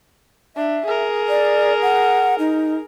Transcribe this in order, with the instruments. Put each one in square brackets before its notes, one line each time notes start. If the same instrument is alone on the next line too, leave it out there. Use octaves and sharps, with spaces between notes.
[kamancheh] D4 [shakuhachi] E5
[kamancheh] G#4 A#4
[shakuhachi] D5
F#5
D#4